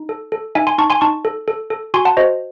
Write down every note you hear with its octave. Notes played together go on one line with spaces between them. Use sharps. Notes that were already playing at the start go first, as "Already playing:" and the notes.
Already playing: D#4
A4
A4
D#4 E5 G#5
G#5 C6
D#4 A5 C#6
G#5 C6
D#4 A5 C#6
A4
A4
A4
F#4 G#5 C6
F#5 A5
F#4 C5 D#5